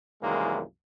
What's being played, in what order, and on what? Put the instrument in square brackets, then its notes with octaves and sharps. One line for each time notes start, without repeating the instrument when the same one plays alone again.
[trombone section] C2 F#2 D#3 E3 G#3 A#3